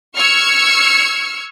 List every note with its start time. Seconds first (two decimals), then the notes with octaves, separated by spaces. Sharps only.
0.15 C#6 E6 F6 G#6 C#7